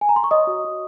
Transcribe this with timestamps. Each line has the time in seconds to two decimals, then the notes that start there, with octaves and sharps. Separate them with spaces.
0.01 G#5
0.09 A#5
0.16 C6
0.24 C#6
0.31 C#5 D#5 D#6
0.47 F#4
0.65 F#4